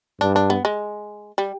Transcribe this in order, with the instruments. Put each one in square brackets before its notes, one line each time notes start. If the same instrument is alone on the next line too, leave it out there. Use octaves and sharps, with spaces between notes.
[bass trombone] G2 [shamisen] D4
[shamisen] D4
B3
G#3
G3